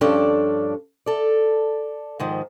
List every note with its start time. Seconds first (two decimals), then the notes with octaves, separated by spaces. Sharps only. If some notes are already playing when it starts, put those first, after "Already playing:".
0.01 G2 F3 C#4 D4 A4 D5
1.06 A4 D5
2.20 G#2 D#3 F3